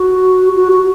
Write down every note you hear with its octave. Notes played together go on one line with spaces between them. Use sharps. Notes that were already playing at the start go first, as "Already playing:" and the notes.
Already playing: F#4
F#4
F#4